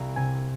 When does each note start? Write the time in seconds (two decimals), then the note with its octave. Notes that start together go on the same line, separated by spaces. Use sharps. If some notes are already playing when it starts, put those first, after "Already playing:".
Already playing: C2 F5 A#5
0.16 C3 G#5